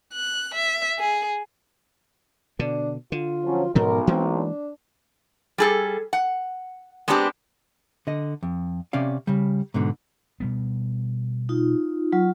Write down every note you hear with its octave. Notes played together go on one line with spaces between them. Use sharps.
F#6
E5
G#4
B2 D3 D4
D3 F4
F3 F#3 C#4
B1 G#2 B2 F3 A#4
E3 G#3 A#3 C4
D4
G3 G#4 A4
F#5
G#3 B3 C4 D4 G4
D3 D#5
F2
C3 C#4 D5 F5
C#3 G3
G#2 B2 D3
B2 G3 B3
D#4 F4
F#3 F4